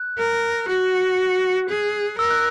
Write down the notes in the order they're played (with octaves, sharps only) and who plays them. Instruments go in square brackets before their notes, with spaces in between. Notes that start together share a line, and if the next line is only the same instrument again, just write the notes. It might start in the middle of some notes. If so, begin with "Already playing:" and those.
Already playing: [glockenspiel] F#6
[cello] A#4
[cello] F#4 [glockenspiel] F#6
[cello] G#4
[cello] A#4 [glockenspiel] E6
[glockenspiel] F#6